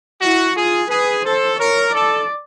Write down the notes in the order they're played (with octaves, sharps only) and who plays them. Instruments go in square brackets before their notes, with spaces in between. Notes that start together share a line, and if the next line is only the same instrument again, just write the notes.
[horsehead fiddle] E4 [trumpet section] F#4
[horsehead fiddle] F4 [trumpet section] G#4
[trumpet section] G#4 [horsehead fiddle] B4
[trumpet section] A4 [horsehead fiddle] C5
[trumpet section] A#4 [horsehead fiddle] C#5
[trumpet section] A4 [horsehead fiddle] D5